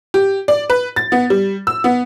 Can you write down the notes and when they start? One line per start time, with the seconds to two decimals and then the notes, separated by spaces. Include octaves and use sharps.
0.14 G4
0.48 D5
0.70 B4
0.96 A6
1.12 B3
1.30 G3
1.67 E6
1.84 B3